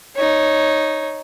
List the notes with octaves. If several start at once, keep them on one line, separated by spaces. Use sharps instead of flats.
D#4 C#5